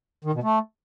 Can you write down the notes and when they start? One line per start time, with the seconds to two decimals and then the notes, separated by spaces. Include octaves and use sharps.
0.24 D#3
0.34 B2
0.43 A3